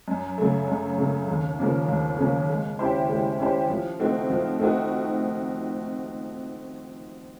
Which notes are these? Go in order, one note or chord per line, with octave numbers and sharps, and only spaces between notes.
F#2
C#3 F#3 A3
F#2
C#3 F#3 A3
D#2
C#3 F3 A#3 C#4
D#2
C#3 F3 A#3 C#4
G#3
C#4 E4 G4 C5
G#3
C#4 E4 G4 C5
F3
A3 C4 D#4 F#4
F3
A3 C4 D#4 F#4